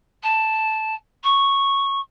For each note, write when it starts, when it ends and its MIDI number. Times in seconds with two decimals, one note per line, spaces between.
0.23 0.94 81
1.23 2.00 85